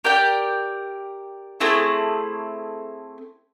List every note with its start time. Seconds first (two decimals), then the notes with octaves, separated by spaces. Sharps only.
0.04 G4 A#4 D5 G5
1.61 A3 C4 E4 G#4